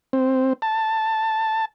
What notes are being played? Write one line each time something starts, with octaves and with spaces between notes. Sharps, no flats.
C4
A5